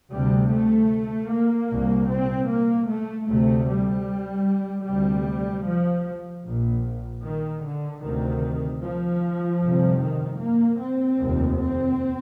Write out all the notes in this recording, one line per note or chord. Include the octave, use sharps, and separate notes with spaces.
D2 C3 G3
A3
A#3
C2 A#2
C4
A#3
A3
D2 C3 A3
G3
D2 C3 G3
F3
A#1 A#2
D#3
D3
D2 C3 D#3
F3
G1 F2 C3
D#3
A#3
C4
F1 D#2
C4